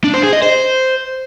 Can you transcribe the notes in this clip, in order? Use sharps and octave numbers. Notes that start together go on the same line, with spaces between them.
D4
C5
G#4
D#5
C5